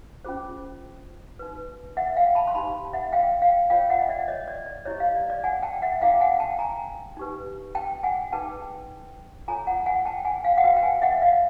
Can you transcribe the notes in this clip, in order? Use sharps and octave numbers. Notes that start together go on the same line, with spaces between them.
C#4 F4 G#4 C5
D#4 F#4 B4
E5 F#5
F5 G5
A5 B5
C6
D#4 G4 C5 A5 B5
E5 F#5
F5 G5
F5 G5
F4 A#4 C#5 F5 G5
E5 F#5
D#5
D5 E5
C#5 D#5
D5
D5
E4 G4 C5 C#5 D#5
D#5 F5
D5
D5
F#5 G#5
G5 A5
E5 F#5
C#4 E4 G#4 F5 G5
F#5 G#5
G5 A5
G#5 A#5
D#4 G4 B4
G5 A5
F#5 G#5
D#4 G#4 B4 G5 A5
F4 A4 C#5 G#5 A#5
F#5 G#5
F#5 G#5
G5 A5
F#5 G#5
F5 G5
F#5
F#4 B4 F5 G5
G5
F#5 G#5
E5 F#5
D#5 F5